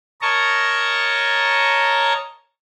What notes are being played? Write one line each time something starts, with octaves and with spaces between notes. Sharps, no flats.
A#4 C#5 D#5 A5 A#5 C#6